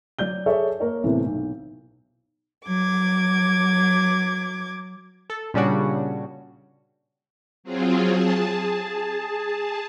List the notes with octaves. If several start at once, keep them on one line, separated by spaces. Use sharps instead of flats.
F#3 D5 G6 G7
G#4 A4 C#5 D5 E5
A#3 A#4 C#5
A2 C3 E3 A3 B3
B1
F#3 D6 G#6
A4
A#2 C#3 G3 C#4 D4 F#4
F#3 C4 F4 G#4
G#4 A5